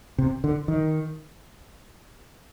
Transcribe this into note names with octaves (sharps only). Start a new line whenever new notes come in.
C3
D3
D#3